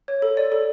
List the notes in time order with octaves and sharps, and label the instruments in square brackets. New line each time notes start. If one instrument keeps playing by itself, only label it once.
[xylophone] C#5
A4
D5
A4